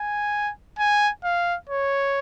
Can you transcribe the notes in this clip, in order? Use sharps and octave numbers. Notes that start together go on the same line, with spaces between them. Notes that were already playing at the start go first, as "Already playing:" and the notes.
Already playing: G#5
G#5
F5
C#5